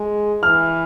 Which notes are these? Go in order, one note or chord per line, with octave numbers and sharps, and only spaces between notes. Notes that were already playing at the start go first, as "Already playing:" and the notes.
Already playing: G#3
E3 F6